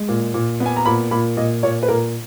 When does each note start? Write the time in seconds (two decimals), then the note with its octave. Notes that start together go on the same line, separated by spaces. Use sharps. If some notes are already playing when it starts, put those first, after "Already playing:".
Already playing: G#3
0.09 A#2
0.34 A#2
0.60 B3
0.66 G#5
0.77 A#5
0.85 A#2 B5
1.11 A#2 B5
1.37 A#2 D#5
1.63 A#2 C#5
1.83 B4
1.88 A#2 A#4